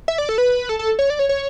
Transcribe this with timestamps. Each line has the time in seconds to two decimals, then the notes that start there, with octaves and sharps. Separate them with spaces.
0.08 E5
0.18 D5
0.29 A4
0.38 B4
0.69 A4
0.79 A4
0.99 C#5
1.10 D5
1.19 C#5
1.29 C#5